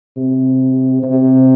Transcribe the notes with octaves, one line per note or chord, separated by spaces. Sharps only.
C3
C3